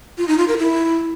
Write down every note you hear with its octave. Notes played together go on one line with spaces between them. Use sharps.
F4
D#4
F4
A#4
E4